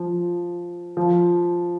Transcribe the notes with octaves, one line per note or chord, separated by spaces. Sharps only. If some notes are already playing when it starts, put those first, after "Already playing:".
Already playing: F3
F3